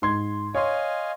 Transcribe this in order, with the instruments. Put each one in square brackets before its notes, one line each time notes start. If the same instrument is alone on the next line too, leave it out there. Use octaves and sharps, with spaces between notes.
[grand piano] G#2 C6 G#6
[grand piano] C#5 C6 [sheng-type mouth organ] D#5 F5 G#5